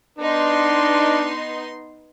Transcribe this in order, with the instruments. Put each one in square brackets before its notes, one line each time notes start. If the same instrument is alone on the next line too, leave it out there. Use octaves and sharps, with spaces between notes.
[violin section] B3 D#4 C6 [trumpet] D4